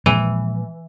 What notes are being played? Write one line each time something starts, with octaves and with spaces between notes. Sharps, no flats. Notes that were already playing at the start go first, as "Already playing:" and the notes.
A#2 E3 F3 G#3